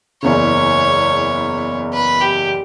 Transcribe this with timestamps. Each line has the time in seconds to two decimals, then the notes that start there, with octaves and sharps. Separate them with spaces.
0.22 F#1 E2 C#3 C#5
1.93 B4
2.21 G4